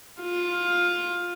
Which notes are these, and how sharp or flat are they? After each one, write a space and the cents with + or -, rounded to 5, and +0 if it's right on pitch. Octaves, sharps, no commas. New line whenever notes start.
F4 +15